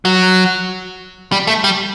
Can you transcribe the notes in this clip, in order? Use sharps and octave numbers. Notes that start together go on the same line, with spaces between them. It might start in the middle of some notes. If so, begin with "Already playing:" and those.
F#3
G3
A3
G3